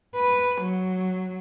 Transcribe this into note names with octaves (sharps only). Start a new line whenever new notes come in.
B4
F#3